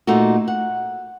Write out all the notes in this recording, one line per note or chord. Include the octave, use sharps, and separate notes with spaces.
A#2 A3 D#4 F#4
F#5